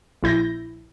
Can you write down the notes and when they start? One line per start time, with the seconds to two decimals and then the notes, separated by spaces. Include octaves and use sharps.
0.23 A#1 E4 G6 A#6